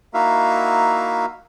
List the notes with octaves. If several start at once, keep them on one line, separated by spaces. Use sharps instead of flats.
A#3 D#4 E4 F#4 E5 F5